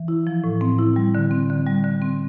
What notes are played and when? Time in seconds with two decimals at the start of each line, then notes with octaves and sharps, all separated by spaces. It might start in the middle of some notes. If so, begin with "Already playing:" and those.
Already playing: E3
0.08 E4
0.27 F3
0.44 A2
0.61 C4
0.79 E4
0.96 G3
1.15 D3
1.31 C4
1.50 D3
1.66 G3
1.84 D3
2.02 C4